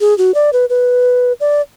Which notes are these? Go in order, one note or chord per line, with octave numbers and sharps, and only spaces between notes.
G#4
F#4
D5
B4
B4
D5